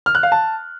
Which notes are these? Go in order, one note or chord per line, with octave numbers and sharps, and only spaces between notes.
F6
F#6
F5
A5